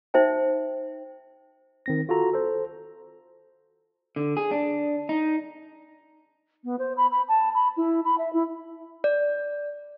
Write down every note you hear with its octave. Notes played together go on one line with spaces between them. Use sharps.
D#4 C5 E5 G5
D#3 C4 A#6
F4 F#4 A4 A#5
A4 C5
D3
G#4
D4
D#4
B3
C5
B5
B5
A5
B5
E4
B5
E5
E4
D5